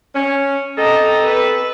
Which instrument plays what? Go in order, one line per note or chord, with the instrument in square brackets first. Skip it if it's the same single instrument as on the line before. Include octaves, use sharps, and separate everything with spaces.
[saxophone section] C#4
[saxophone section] C4 G4 A4 [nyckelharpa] D#5 A#5
[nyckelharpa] B4